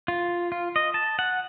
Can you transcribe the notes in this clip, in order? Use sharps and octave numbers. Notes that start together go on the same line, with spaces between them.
F4
F4
D#5
A5
F#5